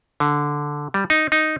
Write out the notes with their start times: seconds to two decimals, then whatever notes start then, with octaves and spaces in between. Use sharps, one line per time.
0.20 D3
0.94 G3
1.10 D#4
1.32 D#4